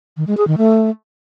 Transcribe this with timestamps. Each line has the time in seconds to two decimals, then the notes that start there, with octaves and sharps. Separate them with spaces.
0.17 D#3
0.27 G#3
0.37 G#4
0.47 D#3
0.58 A3